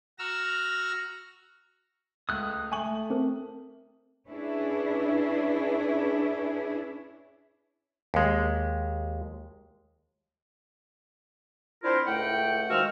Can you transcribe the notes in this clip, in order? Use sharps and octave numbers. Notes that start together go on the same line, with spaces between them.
F#4 A#5 E6 F6
C#2 A3 D#6 F#6 G6
A3 G5 G#5 C#6 D#7 F#7
C4 A#4
C#4 D4 E4 G#4 B4
D#2 G#3
C4 D4 E4 F4 A#4 C5
C#2 A2 A3 F#5 G5
D#3 F3 G#3 F#4 E6 F6